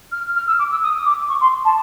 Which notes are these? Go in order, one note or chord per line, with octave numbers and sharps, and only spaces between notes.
F6
F6
E6
D6
E6
D#6
D6
C#6
C6
A5